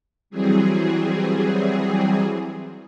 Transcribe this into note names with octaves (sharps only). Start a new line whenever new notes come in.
E3 F#3 G3 C4 G#4